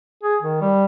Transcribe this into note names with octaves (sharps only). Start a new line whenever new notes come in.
G#4
D#3
G3